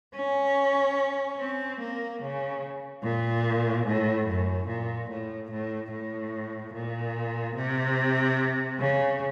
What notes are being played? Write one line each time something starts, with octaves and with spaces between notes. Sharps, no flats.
C#4
C4
A#3
C#3
A#2
A2
F#2
A#2
A2
A2
A2
A#2
C3
C#3